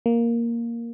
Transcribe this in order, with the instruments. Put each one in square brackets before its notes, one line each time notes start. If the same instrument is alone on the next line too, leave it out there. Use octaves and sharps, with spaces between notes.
[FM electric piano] A#3